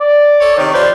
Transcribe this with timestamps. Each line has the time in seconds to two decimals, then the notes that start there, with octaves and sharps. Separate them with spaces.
0.01 D5
0.40 A4 C#5
0.56 C3 D#3 C#5
0.73 F3 B4 C5 D5